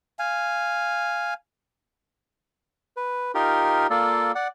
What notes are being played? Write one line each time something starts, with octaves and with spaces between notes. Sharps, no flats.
F5 G#5
B4
D#4 F4 G4 A#4
A#3 F4 A4 D5
D5 F#5